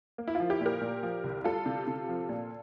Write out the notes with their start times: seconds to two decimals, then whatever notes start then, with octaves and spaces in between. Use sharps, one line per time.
0.18 A#3
0.28 E4
0.35 F4
0.40 F3
0.50 E4 G4
0.61 A#2
0.66 G4 A#4
0.81 A#2
1.03 F3
1.24 C2
1.44 G3 F4 A4
1.66 C3
1.87 C3
2.08 F3
2.29 A#2